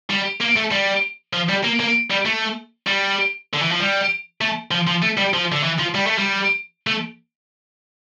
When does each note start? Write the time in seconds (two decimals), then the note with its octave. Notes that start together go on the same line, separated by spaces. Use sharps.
0.10 G3
0.41 A#3
0.57 A3
0.72 G3
1.33 F3
1.49 G3
1.64 A#3
1.80 A#3
2.10 G3
2.25 A3
2.87 G3
3.53 D3
3.62 E3
3.71 F3
3.80 G3
4.41 A3
4.71 F3
4.87 F3
5.02 A3
5.18 G3
5.34 F3
5.53 D3
5.64 E3
5.79 F3
5.95 G3
6.07 A3
6.18 G3
6.87 A3